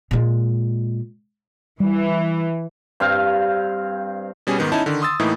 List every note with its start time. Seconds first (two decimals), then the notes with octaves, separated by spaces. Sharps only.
0.11 A#2 G#3
1.80 E3 G3
3.00 G2 C4 F5
4.47 B2 G3 C#4 G#4
4.58 G#2 D#3 B3
4.72 C#4 D#4 E4 A5
4.86 D3 D#3
5.02 C6 D#6 E6 A6
5.20 A2 E3 A#3 D#4 E4